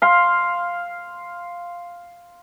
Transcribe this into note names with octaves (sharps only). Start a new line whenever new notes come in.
F5 C6